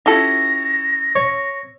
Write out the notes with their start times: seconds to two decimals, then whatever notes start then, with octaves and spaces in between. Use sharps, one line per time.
0.06 C#4 E4 F4 G4 A4 A#6
1.15 C#5